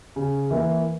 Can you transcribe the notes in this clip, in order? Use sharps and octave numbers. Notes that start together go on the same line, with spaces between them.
C#3
E3 A#3 E4 A#4